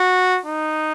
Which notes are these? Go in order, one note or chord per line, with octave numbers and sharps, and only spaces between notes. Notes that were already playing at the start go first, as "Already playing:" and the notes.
Already playing: F#4
D#4